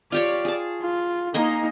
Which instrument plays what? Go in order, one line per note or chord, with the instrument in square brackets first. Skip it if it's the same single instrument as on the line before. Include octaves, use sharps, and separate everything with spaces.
[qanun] F4 G4 C#5 [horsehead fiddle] D5
[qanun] G#4 A5
[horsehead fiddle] F4
[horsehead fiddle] A#3 D#4 [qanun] D#5 G#5 C6